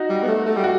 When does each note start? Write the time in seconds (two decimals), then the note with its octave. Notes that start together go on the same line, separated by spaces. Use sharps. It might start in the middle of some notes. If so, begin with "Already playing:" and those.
Already playing: D#4 F#4
0.10 G3
0.23 B3
0.28 A3
0.46 A3
0.57 G3
0.64 F#4